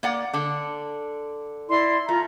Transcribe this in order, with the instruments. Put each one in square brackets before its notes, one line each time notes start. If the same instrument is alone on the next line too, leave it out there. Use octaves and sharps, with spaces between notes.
[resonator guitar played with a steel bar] A#3 D5 F#5
D3 D4
[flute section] E4 D5 C6
[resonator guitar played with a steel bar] A3 [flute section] F4 A#5